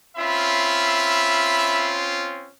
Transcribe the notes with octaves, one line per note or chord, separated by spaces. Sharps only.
C4 C#4 F4 E5 B5